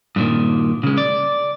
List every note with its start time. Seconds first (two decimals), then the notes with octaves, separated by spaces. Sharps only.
0.16 G2 A#2 D#3
0.83 C#3 G#3
0.98 D5